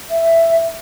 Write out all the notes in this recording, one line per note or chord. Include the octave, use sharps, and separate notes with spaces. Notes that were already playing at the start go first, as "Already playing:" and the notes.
E5